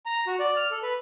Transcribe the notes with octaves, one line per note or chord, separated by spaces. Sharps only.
A#5
F#4
D5
F6
A4
B4